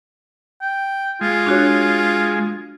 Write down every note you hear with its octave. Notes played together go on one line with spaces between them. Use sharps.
G5
G#3 F4
D4 F#4 C#5